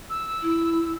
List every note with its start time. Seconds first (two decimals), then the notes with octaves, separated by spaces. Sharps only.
0.09 E6
0.42 E4